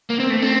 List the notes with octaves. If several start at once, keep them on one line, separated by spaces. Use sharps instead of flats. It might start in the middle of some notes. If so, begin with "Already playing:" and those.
A#3
C4
A3
C4